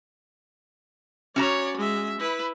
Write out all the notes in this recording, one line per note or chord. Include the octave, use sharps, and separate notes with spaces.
C#4 F#4 C#5 D5 A#5
G#3 E5
E4 B4